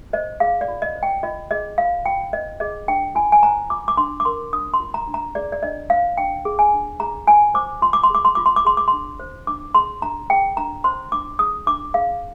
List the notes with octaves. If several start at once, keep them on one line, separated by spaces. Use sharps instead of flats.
C5 D#5
G#4 F5
D5
F4
D#5
C5
G5
F4 D#5
G#4 D#5
F4 F5
F4 G5
C5 D#5
G#4 D#5
D4 G5
F4 G#5
G#5
C5 A#5
F4 D6
D6
D4 C6
D6
A#4 C6
D4 D#6
C6
F4
A#5
D4
A#5
G#4 D5
D5
D4 D#5
C5 F5
D4 G5
G#4
G#5
D4
G#4 A#5
F4 G#5
C5 D6
F4 C6
D6
C6
G#4 D6
C6
F4 D6
C6
D6
G#4 C6
D6
D4 C6
C5
D4 D6
G#4 C6
D4 A#5
G#4 G5
D4 A#5
C5 C6
D4 D6
G#4 D#6
D4 D6
G#4 F5